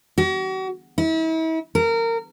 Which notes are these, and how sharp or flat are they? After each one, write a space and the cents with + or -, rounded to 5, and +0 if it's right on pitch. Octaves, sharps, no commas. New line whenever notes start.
F#4 +40
E4 -40
A#4 -25